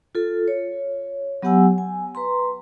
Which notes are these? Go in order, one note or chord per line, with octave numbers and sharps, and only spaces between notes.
F4 A4
C#5
F#3 B3 G4 F#5 G#5 E6
G#5
B4 A#5 C6